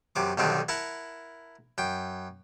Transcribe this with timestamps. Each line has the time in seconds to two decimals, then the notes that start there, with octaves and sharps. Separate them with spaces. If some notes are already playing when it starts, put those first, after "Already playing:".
0.16 F#2 C3 D6
0.38 B1 G2 D3 D#3 C4 D#4
0.69 E4 A#4 F#5 A5
1.78 F#2 G5